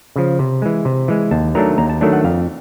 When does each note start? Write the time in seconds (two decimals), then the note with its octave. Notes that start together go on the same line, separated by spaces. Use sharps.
0.16 C#3 F3
0.39 C3
0.62 E3 G#3
0.85 C3
1.08 E3 G#3
1.31 D#2 A5
1.55 D#3 F#3 A3 D4 A#5
1.78 D#2 A#5
1.90 A5
2.01 D#3 F#3 A3 D4
2.13 F#5
2.24 F2 F5